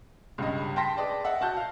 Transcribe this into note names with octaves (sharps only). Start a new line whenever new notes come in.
C#2 G2 D#5
G5 A5 C6 A#6 B6
G#4 B4 D5 G5 A5
E5 F#5
F#4 A5 F#6 G6
F5